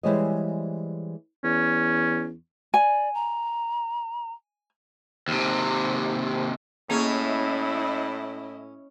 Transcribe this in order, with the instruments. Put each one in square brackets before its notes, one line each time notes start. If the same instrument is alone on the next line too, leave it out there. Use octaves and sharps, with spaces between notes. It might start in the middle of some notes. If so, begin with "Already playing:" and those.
[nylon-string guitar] E3 G3 G#3 C5 C#5 D#5
[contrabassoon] E2 [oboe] C#4
[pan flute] D5 [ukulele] G#5
[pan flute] A#5
[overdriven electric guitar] D#2 C3
[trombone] A2 [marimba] A#3 G#4 [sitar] C#4 [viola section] E4 D#5